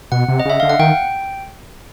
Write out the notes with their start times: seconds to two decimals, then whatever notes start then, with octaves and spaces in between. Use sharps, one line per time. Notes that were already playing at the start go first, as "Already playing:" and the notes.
0.12 B2 F#5
0.28 C3
0.40 D#5
0.45 C#3 E5
0.60 D3 F5
0.69 F#5
0.79 D#3 G5